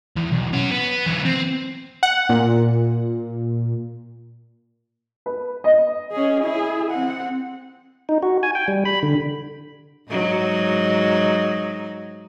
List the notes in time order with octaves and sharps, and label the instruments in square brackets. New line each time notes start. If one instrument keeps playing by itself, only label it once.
[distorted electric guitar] E2
B1
C#4 F#4
B3
E3 F#3
C4
[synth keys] F#5
A#2
[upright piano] B4
D#5
[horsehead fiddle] C#4 G#4
E4 G#4
C4 F#5
[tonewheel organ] D#4
F#4
G#5
G5
G3
B5
D3
[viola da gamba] G#2 F#3 D#4